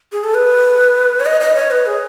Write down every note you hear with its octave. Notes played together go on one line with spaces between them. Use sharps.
G#4
A4
B4
C#5
D#5
D#5
C#5
B4
G#4